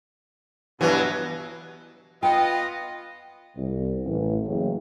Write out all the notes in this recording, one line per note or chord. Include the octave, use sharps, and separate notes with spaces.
G2 B2 E3 F#3
B3 F4 D#5 G5
C2
A1
F#1